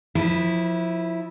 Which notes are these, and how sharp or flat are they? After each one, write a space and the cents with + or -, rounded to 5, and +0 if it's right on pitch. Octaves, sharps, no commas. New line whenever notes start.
F3 +20 E4 +0 B4 -30